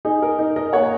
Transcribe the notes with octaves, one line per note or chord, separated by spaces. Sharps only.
D#4 G#4
A#4
D#4
A#4 D#5
A#3 C#5 F#5